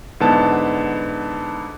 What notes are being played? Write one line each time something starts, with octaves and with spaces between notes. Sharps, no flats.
G#2 D3 B3 E4 A5